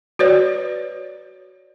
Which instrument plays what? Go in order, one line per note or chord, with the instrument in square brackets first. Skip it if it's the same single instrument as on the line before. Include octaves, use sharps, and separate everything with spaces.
[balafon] F#4 B4 C#5 D5